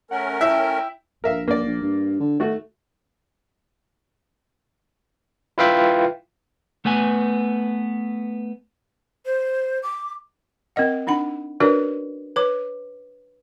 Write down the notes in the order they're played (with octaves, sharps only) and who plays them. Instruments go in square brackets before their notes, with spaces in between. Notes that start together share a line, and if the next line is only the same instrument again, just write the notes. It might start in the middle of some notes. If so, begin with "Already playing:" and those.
[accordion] A3 C#4 A#4 [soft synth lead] F#5
[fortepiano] E4 E5 [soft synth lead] G5
[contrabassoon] A#1 [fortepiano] A#4 E5 F5
[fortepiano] A#3 D5
[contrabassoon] A#1
G2
D3
[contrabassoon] D#3 [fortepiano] A3 F#4
[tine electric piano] E4 F4 B4 E5 F5 G5
[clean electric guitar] A3 B3 B4 G#5
[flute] C5
D6
[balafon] C4 A#4 D#5 F#5
D4 D#4 F#5 B5
D4 F#4 A#4 B4 C#5 D5
B4 C#5 D6